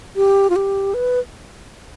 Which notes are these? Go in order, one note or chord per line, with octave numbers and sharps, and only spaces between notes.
G4
F4
G4
B4